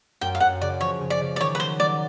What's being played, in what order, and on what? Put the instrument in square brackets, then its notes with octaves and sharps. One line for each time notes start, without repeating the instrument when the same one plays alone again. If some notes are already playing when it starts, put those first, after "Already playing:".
[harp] F#2 [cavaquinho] G5
[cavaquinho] F5
[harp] F#2 [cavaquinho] F#5
[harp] C#3 [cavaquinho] D5
[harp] F3 [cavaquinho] C#5
[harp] C#3
[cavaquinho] D5
[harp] C#3
[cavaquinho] D5
[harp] D#3 [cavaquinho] C#5
[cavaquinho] B4
[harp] F#3 [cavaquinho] C5
[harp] F#3 [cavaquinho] D5